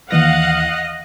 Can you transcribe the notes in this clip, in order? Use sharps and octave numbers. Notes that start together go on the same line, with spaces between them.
D#2 E3 D#5 F5 F#5 A#6